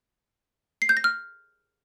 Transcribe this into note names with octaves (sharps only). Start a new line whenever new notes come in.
C7
G6
A#6
F6